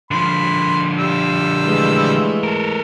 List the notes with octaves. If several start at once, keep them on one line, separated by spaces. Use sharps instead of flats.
D3 F3 B5 C6
G3 F4 E6
E3 G#3 A3
A4 A#4